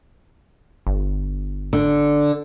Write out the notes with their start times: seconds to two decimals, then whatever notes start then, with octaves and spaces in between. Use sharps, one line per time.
0.87 G1
1.73 D3